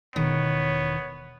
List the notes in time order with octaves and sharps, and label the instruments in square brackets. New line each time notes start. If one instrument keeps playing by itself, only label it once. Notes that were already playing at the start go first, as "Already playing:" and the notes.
[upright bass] E1 [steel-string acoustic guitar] D#3 [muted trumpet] B3 [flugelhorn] C#5